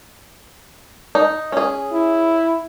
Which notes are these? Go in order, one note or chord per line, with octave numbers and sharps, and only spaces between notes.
D#4
C#4 G#4
E4